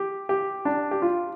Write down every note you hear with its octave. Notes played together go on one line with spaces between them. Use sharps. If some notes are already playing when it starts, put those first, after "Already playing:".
Already playing: G4
G4
D4
G4
F4